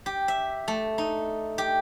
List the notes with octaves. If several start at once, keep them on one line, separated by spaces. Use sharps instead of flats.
G4
E5
A3
D#4
G4